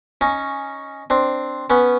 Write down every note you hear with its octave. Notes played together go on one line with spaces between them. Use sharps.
C#4 D#4
C4 D4
B3 C#4